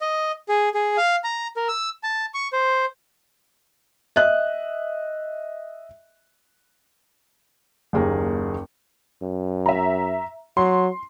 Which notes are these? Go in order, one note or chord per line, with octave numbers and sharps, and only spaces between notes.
D#5
G#4
G#4
F5
A#5
A#4
E6
A5
C#6
C5
D#5 E5 F#6
F#1 D#2 G#4 A#4
F#2
E5 A#5
F#3 C6